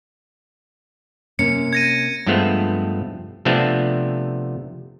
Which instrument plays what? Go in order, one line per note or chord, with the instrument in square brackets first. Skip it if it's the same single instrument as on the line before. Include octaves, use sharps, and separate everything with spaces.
[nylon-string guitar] C3 A#3 C#4 [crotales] C#7
[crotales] G#6 A#6 D#7
[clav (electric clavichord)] G2 F3 G#3 A3 B3 C4
C3 F3 A3 B3 C4 D4